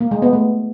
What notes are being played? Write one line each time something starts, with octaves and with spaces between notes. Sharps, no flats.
A#3
G#3
B3
A3